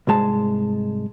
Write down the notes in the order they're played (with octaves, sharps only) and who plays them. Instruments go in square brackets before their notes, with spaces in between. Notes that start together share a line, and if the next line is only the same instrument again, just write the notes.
[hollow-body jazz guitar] C2 G#2 G#3 A5